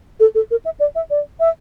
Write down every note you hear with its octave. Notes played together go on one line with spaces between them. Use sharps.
A4
A4
A#4
E5
D5
E5
D5
E5